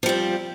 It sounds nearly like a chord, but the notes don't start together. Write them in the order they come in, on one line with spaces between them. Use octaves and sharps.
F3 G3 C4